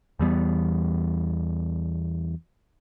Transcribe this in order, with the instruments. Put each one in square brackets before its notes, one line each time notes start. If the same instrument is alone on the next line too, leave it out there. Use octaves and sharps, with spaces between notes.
[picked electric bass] E2 E3 G3 B3